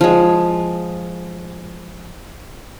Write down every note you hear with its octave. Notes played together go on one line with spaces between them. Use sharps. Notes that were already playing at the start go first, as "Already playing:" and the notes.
F3 G#3